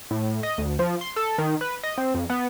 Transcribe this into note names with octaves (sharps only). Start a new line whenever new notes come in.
A2
D#5
D2
F3
C6
A4
D#3
B4
D#5
C4
F2
B3